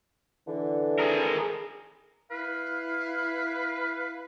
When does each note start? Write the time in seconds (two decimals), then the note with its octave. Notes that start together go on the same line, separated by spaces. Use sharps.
0.47 D3 E3
1.00 G#4 A#4
2.31 E4 B4 F5